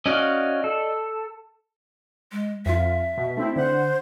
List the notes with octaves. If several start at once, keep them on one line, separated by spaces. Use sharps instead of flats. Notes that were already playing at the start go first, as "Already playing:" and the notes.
C#4 F#4 D5 D#5 F5
A4
G#3
F2 F4 E5
B2
A3 C4 D#4 E4
D3 C5 F#5